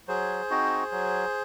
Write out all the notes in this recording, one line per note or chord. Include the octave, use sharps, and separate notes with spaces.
F#3 G#4 C5
C4 D#4 F#4
F#3